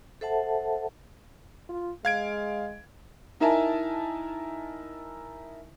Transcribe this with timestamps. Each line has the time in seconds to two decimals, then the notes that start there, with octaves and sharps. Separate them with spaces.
0.21 A4 C5 E5 F#5 A5
1.69 F4
2.05 G#3 F5 G#6 D7
3.40 D#4 E4 A#4 E5 G#5 A5